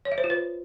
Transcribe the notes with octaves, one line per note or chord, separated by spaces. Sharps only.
C#5
E5
C5
F4
B4